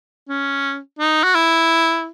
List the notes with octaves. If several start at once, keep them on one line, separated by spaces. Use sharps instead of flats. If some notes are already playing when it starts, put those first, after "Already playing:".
C#4
D#4
F#4
E4